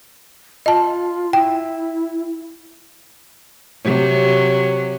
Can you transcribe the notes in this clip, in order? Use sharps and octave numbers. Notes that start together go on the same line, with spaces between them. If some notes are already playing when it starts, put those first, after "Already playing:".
F4 D#5 A5
E4 G5
C3 F#3